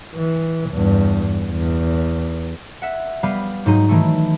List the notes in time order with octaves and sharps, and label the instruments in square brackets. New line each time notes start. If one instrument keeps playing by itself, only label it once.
[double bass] E3
E2 G2
E2
[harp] E5 F#5
G3 B3 F5 B5 D#7
G#2 F#3 D#4
D#3 E3 A3